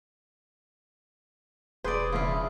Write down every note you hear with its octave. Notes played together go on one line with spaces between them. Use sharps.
E1 G#4 B4 D5 C6 G6
A#1 C#3 E4 F4